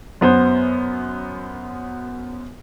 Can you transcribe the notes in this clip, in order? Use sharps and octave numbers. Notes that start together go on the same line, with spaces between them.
F#2 B3 C5